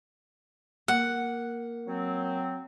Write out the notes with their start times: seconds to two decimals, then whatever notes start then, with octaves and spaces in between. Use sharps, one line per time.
0.88 A#3 F#5
1.87 F#3 C4